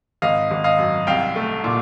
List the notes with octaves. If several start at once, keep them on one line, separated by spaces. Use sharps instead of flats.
G#1 D#5 F5
G#1
D#5 F5
F#2
C2 F5 G5
A3
A#2